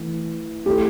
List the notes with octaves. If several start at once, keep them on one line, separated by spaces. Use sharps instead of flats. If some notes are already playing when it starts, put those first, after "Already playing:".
Already playing: E3 A3
A3 E4 G4 A4